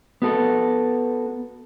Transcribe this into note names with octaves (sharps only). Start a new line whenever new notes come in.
B3 F#4 A4